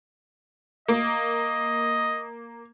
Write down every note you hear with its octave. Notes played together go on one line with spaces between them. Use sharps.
A#3 D#5